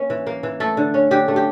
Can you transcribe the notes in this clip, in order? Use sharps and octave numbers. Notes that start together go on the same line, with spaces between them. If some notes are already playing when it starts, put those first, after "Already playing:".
Already playing: A#3 C#4 C#5
E3
A#3
E3
A3 A4
D3
C#4
D3 G4
A3
G4